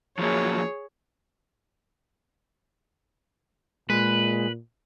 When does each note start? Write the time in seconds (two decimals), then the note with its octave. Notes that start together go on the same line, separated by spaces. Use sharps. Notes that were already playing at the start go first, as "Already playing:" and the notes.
0.19 F3 F#3 A#3 G#4 C#5
3.90 A#2 G#3 B4